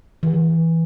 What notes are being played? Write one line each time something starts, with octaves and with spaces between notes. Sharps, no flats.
E3